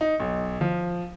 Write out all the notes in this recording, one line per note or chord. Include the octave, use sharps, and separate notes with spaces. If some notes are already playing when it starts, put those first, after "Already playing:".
D#4
B1
F3